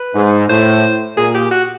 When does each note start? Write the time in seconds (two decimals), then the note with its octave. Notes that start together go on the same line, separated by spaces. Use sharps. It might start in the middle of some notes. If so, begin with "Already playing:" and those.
Already playing: B4
0.15 G#2
0.49 A2 C5
1.17 A#2 G#4
1.34 G4
1.51 F#4